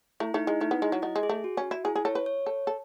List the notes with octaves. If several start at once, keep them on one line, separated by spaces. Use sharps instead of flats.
A3 E4
A3 D#4
G#3 E4
A3 D#4
B3
G#3 E4
F#3
F#3 D#5
G#3
G#4
A3
F#4
C#4
E4
E4 G#4
G#4
A4 C#5
B4
C#5
A4
A4